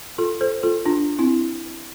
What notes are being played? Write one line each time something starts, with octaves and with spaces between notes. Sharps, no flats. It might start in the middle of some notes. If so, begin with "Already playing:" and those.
F4 A4
A4 C5
F4 A4
D4 F4
C4 E4